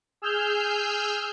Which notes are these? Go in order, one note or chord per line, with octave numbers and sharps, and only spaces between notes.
G#4 E6 F6 G6